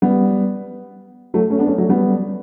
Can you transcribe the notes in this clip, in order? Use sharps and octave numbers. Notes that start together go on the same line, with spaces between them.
G3 B3
F#3 A3
A3 C#4
B3 D4
A3 C#4
F#3 A3
G3 B3